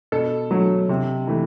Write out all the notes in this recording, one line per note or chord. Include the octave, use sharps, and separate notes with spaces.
B2 A4
F#3 A3
C3
E3 A3